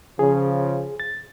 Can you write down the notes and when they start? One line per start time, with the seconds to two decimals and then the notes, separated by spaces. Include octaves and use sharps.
0.19 C#3 F3 G#4
1.00 A6